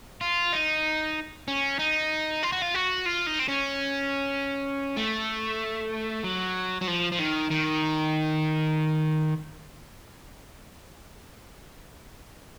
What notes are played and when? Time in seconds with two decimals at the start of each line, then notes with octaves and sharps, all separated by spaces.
0.21 F4
0.53 D#4
1.48 C#4
1.79 D#4
2.43 F4
2.52 F#4
2.62 F4
2.74 F#4
3.06 F4
3.27 D#4
3.40 C4
3.48 C#4
4.97 A3
6.24 F#3
6.81 F#3
6.87 F3
7.12 F3
7.19 D#3
7.51 D#3